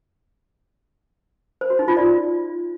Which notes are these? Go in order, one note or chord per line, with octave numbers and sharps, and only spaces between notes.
C5
F#4
D#4
F4
D5